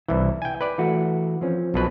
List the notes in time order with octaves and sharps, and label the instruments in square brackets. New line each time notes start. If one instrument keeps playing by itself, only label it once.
[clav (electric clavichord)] C2 E3 [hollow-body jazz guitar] E4
[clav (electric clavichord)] G5 G#5
B4 D5
[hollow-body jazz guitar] E3 A3 F#4
F3 C4 C#4
[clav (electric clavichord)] B1 B2 B4